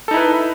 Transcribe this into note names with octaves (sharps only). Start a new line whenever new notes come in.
D#4 E4 A4 B4